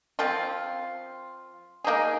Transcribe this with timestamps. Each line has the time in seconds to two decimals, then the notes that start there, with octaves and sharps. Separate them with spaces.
0.19 F3 C4 F4
1.84 A#3 D#4 G#4